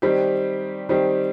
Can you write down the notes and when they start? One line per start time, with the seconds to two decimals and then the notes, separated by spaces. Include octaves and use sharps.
0.02 D#3 G3 C4 G4
0.89 D#3 G3 C4 G4